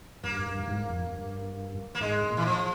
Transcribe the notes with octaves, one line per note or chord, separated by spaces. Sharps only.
G2 A#3
G2
G2
G#2
F2
G2
A#3
G#2 G#3
A#2
E3
F3